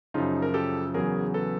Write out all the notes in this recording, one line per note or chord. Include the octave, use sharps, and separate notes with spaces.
F#2 C#3 F3 D#4 F4
A#4
G4 A4
E2 C#3 F#3 G#4 A#4
A4 B4